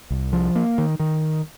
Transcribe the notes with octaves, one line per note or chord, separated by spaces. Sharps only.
C2
F3
A#3
D#3
D#3